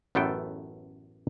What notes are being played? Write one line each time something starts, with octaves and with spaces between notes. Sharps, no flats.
A1 F#2 A3 B3 A4 G5